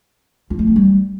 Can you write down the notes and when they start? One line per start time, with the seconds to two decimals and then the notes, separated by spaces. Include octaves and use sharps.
0.50 F4
0.59 A3
0.67 C4
0.76 G3